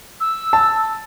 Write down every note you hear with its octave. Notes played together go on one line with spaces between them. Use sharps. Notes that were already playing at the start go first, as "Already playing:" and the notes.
E6
A5